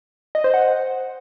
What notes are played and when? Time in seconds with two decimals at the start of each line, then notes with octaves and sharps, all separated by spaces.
0.35 D#5
0.44 C5
0.54 F#5